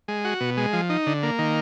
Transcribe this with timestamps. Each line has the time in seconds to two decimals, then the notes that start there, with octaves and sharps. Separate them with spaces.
0.08 G#3
0.25 F#4
0.40 B2
0.57 G#3
0.73 F3
0.89 D#4
1.06 D3
1.23 A#3
1.39 D#3